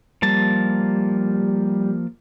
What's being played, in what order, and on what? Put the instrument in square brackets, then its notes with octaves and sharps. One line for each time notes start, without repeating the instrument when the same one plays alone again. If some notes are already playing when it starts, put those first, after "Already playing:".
[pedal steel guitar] F3 A#3 A5 [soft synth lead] G3